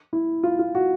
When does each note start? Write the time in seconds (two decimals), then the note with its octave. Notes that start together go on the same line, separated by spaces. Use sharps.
0.13 E4
0.43 F4
0.59 F4
0.75 F#4